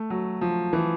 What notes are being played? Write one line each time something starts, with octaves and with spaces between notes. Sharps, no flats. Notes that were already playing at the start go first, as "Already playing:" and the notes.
Already playing: A3
F#3
F3
E3